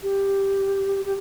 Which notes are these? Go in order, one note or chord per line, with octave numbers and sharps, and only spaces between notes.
G4
G4